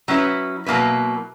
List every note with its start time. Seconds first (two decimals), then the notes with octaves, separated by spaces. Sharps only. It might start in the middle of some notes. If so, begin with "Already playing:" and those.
0.08 F#3 C#4 E4 B4
0.66 B2 F#3 A#3 E4 B4